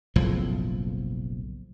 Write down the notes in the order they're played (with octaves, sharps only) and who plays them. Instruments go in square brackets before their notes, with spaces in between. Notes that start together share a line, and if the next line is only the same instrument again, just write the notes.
[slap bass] F#1 B1 A2 F3